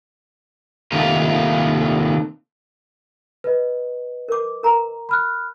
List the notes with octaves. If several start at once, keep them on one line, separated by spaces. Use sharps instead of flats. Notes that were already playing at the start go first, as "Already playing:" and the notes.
C3 D#3 A3 A#3 F4
B4 D#5
A#4 D6
A#4 A#5
B5 F6 F#6